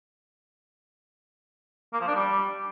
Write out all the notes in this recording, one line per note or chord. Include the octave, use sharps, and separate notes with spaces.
A#3
F3
D4
G3